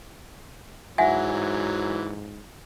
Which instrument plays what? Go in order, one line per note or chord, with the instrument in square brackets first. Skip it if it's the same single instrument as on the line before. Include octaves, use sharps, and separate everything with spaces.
[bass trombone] G#2 [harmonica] E3 F#3 [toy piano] E5 F#5 G#5